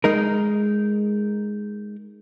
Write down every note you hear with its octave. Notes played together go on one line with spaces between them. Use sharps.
G#3 D#4 A#4